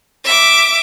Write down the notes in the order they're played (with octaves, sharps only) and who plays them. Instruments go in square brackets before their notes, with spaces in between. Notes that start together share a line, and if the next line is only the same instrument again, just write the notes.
[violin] E5 D6